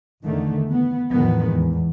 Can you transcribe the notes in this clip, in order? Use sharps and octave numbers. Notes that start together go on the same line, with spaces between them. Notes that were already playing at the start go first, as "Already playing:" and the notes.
E2 D3 D#3 A3
B3
E2 A2 D#3 F3 G#3 B3
E2